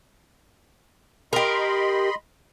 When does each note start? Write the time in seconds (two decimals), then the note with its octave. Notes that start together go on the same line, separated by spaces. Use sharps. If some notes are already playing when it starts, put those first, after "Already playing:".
1.33 G4 A#4 D#5 B5 C6